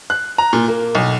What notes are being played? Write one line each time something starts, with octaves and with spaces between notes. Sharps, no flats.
F#6
A#5
A#2
A#3
B1